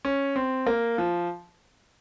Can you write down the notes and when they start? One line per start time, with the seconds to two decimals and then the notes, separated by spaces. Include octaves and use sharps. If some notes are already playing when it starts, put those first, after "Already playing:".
0.05 C#4
0.36 C4
0.67 A#3
0.98 F3